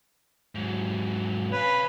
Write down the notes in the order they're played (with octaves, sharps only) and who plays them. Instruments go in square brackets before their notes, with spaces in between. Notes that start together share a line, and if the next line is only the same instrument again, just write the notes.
[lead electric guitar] G#2 F#3
[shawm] B4 [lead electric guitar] C#5 F5